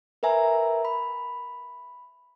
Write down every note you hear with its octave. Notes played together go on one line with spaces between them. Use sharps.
A#4 B4 E5 G#5 A#5
B5